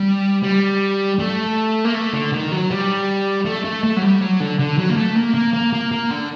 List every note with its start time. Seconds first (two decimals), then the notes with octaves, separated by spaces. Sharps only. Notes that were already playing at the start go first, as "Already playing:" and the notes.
Already playing: G3
0.43 G3
1.19 A3
1.85 A#3
1.95 A3
2.13 D3
2.32 D#3
2.52 F#3
2.71 G3
3.46 A3
3.65 A3
3.84 A3
3.97 F#3
4.03 G3
4.21 F#3
4.40 D3
4.59 D3
4.78 F#3
4.90 A#3
4.97 A3
5.16 A#3
5.35 A#3
5.54 A#3
5.73 A#3
5.92 A#3
6.10 D3